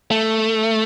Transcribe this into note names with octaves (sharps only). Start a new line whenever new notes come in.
A3